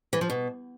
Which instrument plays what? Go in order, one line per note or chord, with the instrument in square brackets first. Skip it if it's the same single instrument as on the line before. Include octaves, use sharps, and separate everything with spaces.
[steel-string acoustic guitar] E3
F3
B2